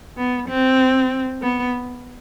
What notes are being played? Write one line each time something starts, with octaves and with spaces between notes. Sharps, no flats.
B3
C4
B3